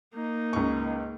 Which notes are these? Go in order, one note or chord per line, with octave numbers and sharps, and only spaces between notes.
A#3 D#4
C#2 C#6